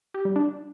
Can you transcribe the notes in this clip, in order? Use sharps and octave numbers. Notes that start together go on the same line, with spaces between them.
G4
G3
D4